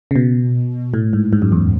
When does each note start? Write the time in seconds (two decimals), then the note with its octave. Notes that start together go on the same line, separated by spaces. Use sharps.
0.11 C#3
0.16 B2
0.94 A2
1.13 G#2
1.33 G#2
1.42 F#2
1.52 E2